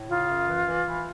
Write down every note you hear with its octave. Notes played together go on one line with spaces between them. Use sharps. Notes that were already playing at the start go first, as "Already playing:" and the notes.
Already playing: A2
C#3 F4
F#2
E3
E3
E3